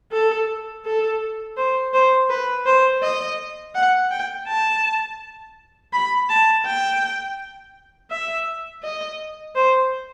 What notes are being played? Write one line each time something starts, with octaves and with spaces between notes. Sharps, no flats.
A4
A4
C5
C5
B4
C5
D#5
F#5
G5
A5
B5
A5
G5
E5
D#5
C5